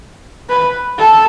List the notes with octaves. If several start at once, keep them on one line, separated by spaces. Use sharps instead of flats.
B4
A4